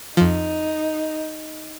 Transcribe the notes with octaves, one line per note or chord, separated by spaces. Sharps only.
F2 F3 D#4